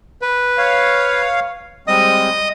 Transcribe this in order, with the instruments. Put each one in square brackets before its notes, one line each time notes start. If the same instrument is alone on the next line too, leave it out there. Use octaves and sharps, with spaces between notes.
[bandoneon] B4
[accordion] C#5 F5
[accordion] G3 G#3 C4 [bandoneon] D#5 D#6